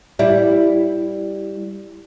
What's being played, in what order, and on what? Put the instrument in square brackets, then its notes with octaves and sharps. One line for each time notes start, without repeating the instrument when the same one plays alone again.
[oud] G3 E4